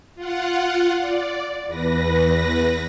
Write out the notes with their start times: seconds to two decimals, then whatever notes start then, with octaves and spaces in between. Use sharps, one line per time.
0.15 F4 F#5
1.00 D5
1.67 E2 B4 A#6